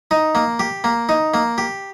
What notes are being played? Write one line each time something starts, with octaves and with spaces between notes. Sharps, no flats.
D#4
A#3
G4
A#3
D#4
A#3
G4